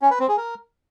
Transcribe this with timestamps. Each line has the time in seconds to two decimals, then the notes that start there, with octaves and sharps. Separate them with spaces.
0.02 C#4
0.11 B4
0.20 C4
0.29 G#4
0.37 A#4